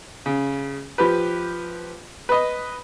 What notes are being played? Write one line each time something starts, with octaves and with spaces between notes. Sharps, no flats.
C#3
F3 G4 B4
B4 D#5